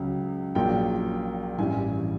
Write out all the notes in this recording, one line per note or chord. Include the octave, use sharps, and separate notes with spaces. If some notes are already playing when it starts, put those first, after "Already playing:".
Already playing: C#2 C#3 F#3
A#1 A#2 F#3 G5
A1 G2 E3 G#5